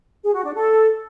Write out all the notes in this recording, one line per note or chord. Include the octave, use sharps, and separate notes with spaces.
G#4
F#4
D4
A4